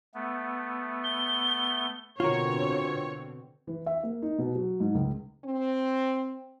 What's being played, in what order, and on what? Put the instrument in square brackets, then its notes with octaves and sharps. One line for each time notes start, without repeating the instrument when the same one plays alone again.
[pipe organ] A3 B3
[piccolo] G7
[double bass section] B2 D3 C4 [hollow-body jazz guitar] F4 F#4 A#4 [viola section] C#5
[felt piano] E3
E5
A#3
D#4
B2
F#3
G#2
C#2
[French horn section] C4